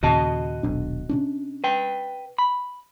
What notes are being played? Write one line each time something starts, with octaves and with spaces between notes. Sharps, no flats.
D#2 A#2 C#3 F#4 D#5 A5
D#1 B1 D4
C3 C#4 D4
B4 G5
B5